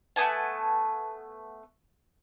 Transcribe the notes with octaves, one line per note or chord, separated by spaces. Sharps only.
A3 B3 G#5 A5